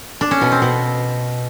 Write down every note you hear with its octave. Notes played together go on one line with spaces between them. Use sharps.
D4
C#4
B2
C4
B2